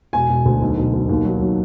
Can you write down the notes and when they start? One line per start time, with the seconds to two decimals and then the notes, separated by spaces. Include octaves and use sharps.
0.13 E1 G#5
0.29 E1
0.45 D2
0.62 B1
0.78 B1
0.94 B1
1.09 D#2
1.25 F#3
1.41 F#3